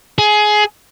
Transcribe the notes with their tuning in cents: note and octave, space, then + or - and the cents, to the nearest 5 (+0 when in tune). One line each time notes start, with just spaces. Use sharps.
G#4 +20